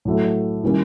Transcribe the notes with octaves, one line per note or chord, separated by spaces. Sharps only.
A2 F#3 A3
D#3 G3 A#3 C#4 E4